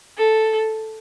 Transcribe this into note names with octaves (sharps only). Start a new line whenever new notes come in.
A4